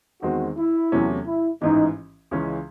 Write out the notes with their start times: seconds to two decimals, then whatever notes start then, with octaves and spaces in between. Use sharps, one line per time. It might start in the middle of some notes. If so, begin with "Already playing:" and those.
0.22 E2 D#3 G#3 C4 F#4
0.58 E4
0.92 E2 C3 F#3 A3 C#4
1.26 E4
1.61 A1 G#2 E3 D#4
2.31 C#2 C#3 E3 G#3 C#4